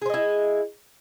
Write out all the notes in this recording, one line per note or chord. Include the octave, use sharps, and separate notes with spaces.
E4 G#4 C5 D#5